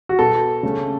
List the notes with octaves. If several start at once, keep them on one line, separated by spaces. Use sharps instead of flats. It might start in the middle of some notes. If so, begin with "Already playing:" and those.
F#4
B2 B3 A4
C#3 A3 C#4